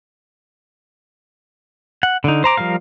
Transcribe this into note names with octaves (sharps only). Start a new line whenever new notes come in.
F#5
D3 D#4
C5 A#5 D6
F3 G3 A#4 F5